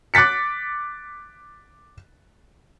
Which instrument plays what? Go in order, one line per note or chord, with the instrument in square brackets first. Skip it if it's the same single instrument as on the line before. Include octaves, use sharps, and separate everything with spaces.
[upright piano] D6 F#6 A6 B6 C#7